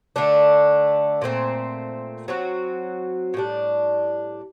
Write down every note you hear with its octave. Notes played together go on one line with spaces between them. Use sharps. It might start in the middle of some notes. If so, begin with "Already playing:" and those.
D3 A3 D4
A#2 A3 C4
F#3 C4 F#4
A2 G3 D4